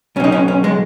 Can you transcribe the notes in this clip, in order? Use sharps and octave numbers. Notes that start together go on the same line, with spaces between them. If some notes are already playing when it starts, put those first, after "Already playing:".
B1 B2 C#4 D#4
C#4
C#4
G#3